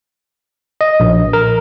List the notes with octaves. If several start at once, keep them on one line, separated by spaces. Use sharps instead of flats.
D#5
A#1
A#4